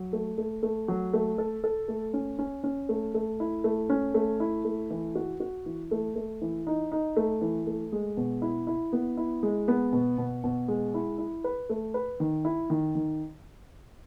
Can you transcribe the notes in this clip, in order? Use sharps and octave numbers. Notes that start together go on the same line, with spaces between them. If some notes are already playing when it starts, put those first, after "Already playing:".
Already playing: F#3
A3
A3
A3
F#3
A3
A4
A4
A3
C#4
C#4
C#4
A3
A3
E4
A3
C#4
A3
E4
A3
E3
F#4
F#4
E3
A3
A3
E3
D#4
D#4
A3
E3
A3
G#3
B2
E4
E4
B3
E4
G#3
B3
B2
B2
B2
G#3
E4
E4
B4
A3
B4
D#3
E4
D#3
D#3